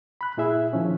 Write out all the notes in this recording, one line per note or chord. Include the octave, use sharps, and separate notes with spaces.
B5 F#6
A#2 E4 G#4 E5
D#3 F3 C#4